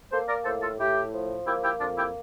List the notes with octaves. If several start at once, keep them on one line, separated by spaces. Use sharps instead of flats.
A#3 A4 C5
A#4 D5
A2 A4 C5
F4 A4
A2 E4 G4
F3
A#3 E4 G4
E4 G4
F2 D4 F4
E4 G4